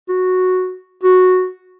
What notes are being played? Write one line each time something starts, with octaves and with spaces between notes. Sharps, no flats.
F#4
F#4